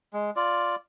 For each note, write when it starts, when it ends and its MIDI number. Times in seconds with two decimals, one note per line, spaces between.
0.13 0.30 56
0.36 0.75 65
0.36 0.75 74